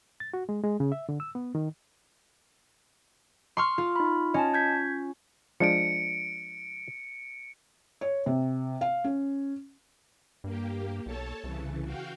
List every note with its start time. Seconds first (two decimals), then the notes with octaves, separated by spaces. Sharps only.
0.20 A6
0.33 F#4
0.49 G#3
0.64 G#3
0.80 C#3
0.92 E5
1.09 D3
1.20 E6
1.35 B3
1.55 D#3
3.57 C6 C#6 F6
3.78 F4
3.96 D#4 B5
4.34 C#4 D#5 G#5 A5
4.54 G6 G#6 B6
5.60 F3 G#3 D4 C#7 D7
8.01 C#5
8.26 C3
8.81 F5
9.04 C#4
10.44 G2 A#3 G4
11.06 B1 A4 C#5 A5
11.44 C2 C#3 E3
11.84 F#4 F5 G5